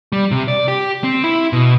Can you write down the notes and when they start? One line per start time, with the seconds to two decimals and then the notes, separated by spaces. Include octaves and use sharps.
0.12 G3
0.31 C3
0.48 D5
0.68 G4
1.04 C4
1.24 E4
1.53 B2